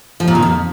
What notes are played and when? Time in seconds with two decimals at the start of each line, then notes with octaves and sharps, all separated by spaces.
0.20 F3
0.28 A#2
0.35 D#3
0.42 F2